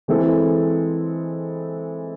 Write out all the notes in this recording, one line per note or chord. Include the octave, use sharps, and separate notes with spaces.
E3 G#3 C4 E4 A4